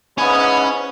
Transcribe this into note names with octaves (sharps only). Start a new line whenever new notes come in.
G#2 E3 B3 C#4 G#5